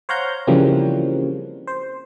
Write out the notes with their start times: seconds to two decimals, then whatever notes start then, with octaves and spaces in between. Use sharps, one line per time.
0.09 C5 C#5 F5 F#5 A#5 G6
0.47 C#3 E3 F3 G3 A#3 C4
1.67 C5